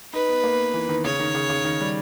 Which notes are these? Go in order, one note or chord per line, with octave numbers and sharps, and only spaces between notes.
D#4 B4
B3
A#3
E3
D#3
C#3 C#5
D#3
C#3
C#3
D#3
G3